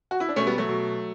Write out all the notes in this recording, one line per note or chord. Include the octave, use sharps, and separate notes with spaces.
F#4
E4
D4
B2 A3 C#4
G3 B3
F#3 A3
B2